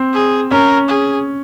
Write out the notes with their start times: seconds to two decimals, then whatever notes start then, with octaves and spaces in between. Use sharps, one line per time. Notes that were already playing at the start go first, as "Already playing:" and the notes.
Already playing: C4
0.13 G#4
0.51 C#4 A#4
0.88 G#4